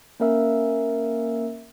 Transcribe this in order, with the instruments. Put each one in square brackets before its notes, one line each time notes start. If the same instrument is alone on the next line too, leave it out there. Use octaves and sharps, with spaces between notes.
[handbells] A#3 C#4 A#4 E5 E6